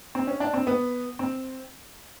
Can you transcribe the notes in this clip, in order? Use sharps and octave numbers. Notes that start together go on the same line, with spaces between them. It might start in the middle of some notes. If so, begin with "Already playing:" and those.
C4
C#4
D4
C4
B3
C4